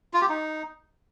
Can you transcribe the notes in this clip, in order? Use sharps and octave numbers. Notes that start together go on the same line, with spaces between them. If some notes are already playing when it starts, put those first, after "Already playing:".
F4
G4
D#4